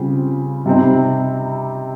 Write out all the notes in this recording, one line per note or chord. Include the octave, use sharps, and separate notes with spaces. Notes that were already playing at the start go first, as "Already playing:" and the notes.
Already playing: C#3 G3 C4 F4
C3 G3 C4 D#4